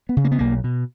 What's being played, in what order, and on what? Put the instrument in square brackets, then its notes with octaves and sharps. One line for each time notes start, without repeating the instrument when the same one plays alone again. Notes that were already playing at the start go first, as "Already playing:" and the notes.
[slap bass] B3
C#3
A#3
B3
B1 A#3
B2